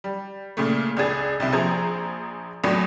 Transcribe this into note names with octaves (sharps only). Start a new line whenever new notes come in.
G3
A#2 C#3 A3
C#2 D4 G#4 A6
C2 C3 E4
A#1 F3 G#4 A#5
E2 A2 F#3 D4